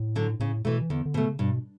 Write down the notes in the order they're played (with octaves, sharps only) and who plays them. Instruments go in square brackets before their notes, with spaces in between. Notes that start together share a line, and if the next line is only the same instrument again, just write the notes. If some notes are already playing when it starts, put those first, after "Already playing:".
Already playing: [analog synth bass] A2
[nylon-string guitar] D3 F#3
[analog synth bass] A2 [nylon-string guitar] C#3
[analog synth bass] B2 [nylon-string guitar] E3 A3
[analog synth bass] E3
[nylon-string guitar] E2 [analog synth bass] D3
[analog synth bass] D3
[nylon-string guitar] B2 A3
[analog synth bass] C#3
[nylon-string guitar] G2 [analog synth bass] B2